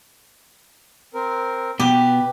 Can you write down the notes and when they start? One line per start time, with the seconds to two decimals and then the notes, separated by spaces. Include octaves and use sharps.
1.14 C4 A#4
1.80 B2 B3 G4 B4